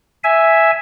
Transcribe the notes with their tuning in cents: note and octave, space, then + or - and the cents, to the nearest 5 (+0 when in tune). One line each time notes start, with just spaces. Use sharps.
E5 +0 G#5 +0